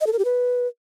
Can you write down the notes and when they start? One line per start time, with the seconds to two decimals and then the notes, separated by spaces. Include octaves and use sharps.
0.01 D#5
0.07 A4
0.13 A#4
0.19 G4
0.25 B4